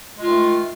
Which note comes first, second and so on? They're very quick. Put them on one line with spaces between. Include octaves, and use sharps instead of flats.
G#3 F4 D#3 A3